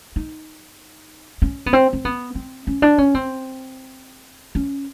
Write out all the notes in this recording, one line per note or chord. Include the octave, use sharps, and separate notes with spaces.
D#4
C#4
B3
C4
C4
B3
C4
C#4
D4
C#4
C4
C#4